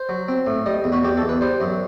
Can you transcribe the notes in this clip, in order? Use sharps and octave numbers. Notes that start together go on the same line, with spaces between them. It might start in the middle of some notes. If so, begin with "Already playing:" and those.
Already playing: C5
F#3
C4
A2
G3 D#5
E2
F#4
E2 G4
E2 A4
B4
G3 C5
F#2